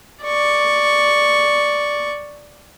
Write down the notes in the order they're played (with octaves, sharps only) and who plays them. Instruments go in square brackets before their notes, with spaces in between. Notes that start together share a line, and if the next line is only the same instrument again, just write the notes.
[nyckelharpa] D5 C#6